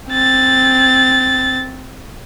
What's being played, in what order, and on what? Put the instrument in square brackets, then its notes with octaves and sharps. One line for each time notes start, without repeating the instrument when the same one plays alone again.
[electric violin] C4 A6